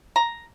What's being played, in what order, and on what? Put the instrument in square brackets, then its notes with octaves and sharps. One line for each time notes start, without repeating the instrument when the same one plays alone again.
[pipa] A#5